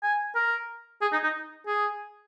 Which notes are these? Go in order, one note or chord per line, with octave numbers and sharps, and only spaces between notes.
G#5
A#4
G#4
D#4
D#4
G#4